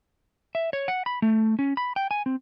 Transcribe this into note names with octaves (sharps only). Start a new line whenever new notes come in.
E5
C#5
F#5
B5
A3
C#4
B5
G5
G#5
C4